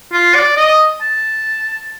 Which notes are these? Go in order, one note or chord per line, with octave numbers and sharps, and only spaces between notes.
F4
D5
D#5
A5